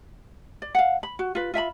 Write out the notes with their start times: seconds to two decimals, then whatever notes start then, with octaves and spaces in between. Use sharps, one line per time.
0.62 D5
0.75 F5 F#5
1.03 B5
1.19 F#4
1.35 F4 B4
1.54 F4 E5 G5 B5